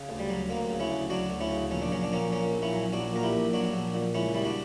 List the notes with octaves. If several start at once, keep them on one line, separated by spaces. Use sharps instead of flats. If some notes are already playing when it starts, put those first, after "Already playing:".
Already playing: C#3
D2
G3
F#3
D2 A#3
C#3
C#4 E4
D2
F#3 D4 F#4
D2
C#4 E4
C#3
A#1 C#4
D4
F#3 C#4
D4
A#1 A#3 C#4
A#2 A#3 C#4
A#1
C#4 E4
F#3
A#1 D4 F#4
A#2 A#4
E4 G4
A#1
F#3 D4 F#4
A#1
A#2
C#2 C#4 E4
G3 E4
D4 F#4